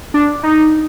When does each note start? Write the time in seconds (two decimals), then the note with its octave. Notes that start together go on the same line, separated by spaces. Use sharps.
0.14 D4
0.43 D#4